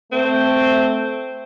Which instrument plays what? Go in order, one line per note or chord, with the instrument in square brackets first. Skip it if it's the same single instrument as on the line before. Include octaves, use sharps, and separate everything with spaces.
[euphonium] A3 [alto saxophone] C4